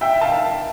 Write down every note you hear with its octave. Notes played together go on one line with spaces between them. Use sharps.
E5 G5
F5 A5